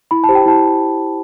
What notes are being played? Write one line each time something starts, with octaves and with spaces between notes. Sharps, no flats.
E4 B5
A5
G4 C5
G5
E4 A5